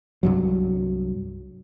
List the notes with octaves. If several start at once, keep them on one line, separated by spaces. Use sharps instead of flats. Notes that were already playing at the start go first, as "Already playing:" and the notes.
C2 G2 F#3